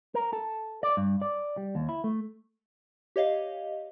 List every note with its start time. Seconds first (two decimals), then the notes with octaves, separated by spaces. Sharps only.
0.15 A#4
0.33 A4
0.83 D5
0.97 G2
1.22 D5
1.57 G3
1.75 D#2
1.89 E4
2.04 A3
3.16 G4 C#5 D#5 F5